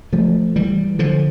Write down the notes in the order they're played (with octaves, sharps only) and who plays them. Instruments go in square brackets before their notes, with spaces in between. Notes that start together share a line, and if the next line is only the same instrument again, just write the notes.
[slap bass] F3 A3
E3 G3
D3 F3